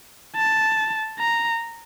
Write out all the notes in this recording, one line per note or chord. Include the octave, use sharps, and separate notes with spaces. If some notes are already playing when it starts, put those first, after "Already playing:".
A5
A#5